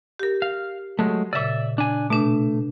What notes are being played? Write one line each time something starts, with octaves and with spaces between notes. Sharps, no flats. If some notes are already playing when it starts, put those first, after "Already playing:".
G4 A#4
F5
F#3 G#3 A3
A#2 C#3 D5 E5
D4 G#5
B2 A3 D4